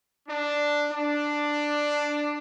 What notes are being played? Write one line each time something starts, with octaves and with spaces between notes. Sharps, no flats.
D4
D4